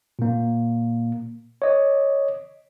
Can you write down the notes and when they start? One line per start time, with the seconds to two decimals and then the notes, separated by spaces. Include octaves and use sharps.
0.19 A#2 A#3
1.62 C#5 D#5